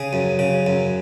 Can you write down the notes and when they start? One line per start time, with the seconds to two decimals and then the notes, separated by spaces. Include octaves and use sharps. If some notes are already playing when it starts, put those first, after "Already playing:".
Already playing: C#3 G#4
0.13 F#2
0.39 C#3
0.67 F#2